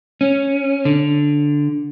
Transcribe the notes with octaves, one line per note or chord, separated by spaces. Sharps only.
C#4
D3